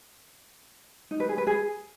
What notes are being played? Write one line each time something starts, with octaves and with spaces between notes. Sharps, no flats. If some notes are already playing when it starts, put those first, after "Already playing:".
D#4
B4
G#4
B4
G#4